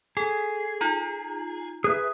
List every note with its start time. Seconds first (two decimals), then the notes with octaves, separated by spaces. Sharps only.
0.17 G#4 A4
0.81 D#4 F4 A#5
1.84 G#4 B4 E5